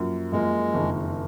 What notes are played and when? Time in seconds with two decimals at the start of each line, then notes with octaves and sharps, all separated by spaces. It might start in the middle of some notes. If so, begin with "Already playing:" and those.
Already playing: F#2 F3 A#3
0.32 F#2 F3 G#3 A#3
0.74 F#1 F2 D#3